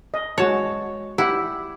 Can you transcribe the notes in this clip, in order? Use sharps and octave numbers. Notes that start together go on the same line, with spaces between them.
D#5
G#3 F#4 C#5 A5
E4 G4 F#5